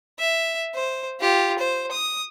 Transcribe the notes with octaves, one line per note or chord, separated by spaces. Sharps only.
E5
C5
F4 G4
C5
D#6